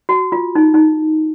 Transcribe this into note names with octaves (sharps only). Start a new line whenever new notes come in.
F#4
F4
D#4
D#4